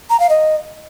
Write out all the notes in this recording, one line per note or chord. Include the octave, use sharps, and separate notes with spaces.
A#5
F5
D#5